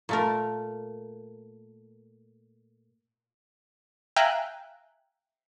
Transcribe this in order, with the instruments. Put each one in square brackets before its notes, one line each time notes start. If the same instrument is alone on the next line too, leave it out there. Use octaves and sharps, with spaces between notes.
[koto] A#2 A3 A#4
[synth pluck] E5 F5 G5 G#5 A#5 F#6